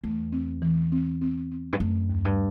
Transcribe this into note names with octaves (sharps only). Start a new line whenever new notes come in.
E2 A3
C4
E3
C4
C4
C4
G2
F#2 A3
D#2
G2